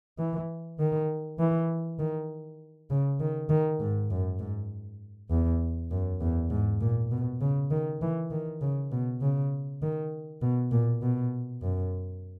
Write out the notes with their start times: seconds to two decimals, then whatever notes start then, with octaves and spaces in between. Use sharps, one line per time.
0.18 E3
0.79 D#3
1.39 E3
1.99 D#3
2.90 C#3
3.20 D#3
3.50 D#3
3.80 G#2
4.10 F#2
4.40 G#2
5.30 E2
5.91 F#2
6.20 E2
6.51 G#2
6.81 A#2
7.12 B2
7.41 C#3
7.71 D#3
8.02 E3
8.31 D#3
8.61 C#3
8.92 B2
9.21 C#3
9.82 D#3
10.42 B2
10.72 A#2
11.02 B2
11.62 F#2